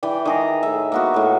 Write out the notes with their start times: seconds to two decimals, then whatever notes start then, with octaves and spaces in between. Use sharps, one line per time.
0.03 E3 D5 G5
0.25 D#3 G#4 A#5
0.63 A2 E5
0.92 A#3 B3 F#4
1.14 A2 E5